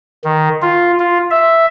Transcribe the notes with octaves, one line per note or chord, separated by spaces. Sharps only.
D#3
F4
F4
E5